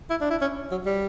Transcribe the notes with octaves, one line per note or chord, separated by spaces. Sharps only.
E4
D4
E4
C#4
F#3
G3